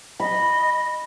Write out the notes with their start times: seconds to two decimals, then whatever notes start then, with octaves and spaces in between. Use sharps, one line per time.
0.20 D#5 B5